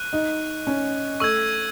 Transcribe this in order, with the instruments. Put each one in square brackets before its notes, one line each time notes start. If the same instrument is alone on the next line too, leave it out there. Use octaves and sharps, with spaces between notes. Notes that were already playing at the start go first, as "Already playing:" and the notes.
Already playing: [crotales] C#6 F#6
[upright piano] D#4
C#4
[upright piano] A3 [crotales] C#6 E6 G#6